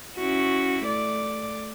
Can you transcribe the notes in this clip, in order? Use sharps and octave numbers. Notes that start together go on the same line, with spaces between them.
C#4 E4 F#4
A3 D5